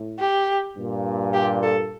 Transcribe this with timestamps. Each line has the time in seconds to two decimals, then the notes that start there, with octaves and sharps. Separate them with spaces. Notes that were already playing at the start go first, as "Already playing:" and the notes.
Already playing: A2
0.19 G4
0.76 G2 A#2
1.34 G4
1.63 A4